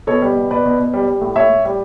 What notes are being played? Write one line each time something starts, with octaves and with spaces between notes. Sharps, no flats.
B2 A4 C#5
G3
B2
B2 B4 D5
B2
B2
G3
G3
A2
A2 C#5 E5
A2
G3